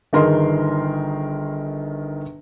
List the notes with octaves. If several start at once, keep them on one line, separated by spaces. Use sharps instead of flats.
G1 D#3 G#4 A#4 D#5 C6